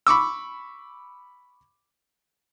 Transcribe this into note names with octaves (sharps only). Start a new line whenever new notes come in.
B5 C#6 D6 E6